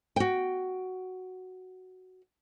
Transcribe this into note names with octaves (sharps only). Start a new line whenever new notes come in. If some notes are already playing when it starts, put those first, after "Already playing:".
F#4 G5